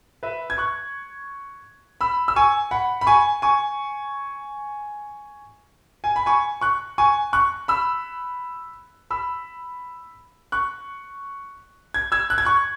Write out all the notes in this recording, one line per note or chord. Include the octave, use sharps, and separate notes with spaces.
B4 E5
G#6
C#6 F#6
B5 E6
E6
G#5 C#6
F#5 B5
B5
G#5 C#6
G#5 C#6
G#5
B5
G#5 C#6
C#6 F#6
G#5 C#6
C#6 F#6
B5 E6
B5 E6
C#6 F#6
G#6
E6 G#6
F#6
G#6
C#6 F#6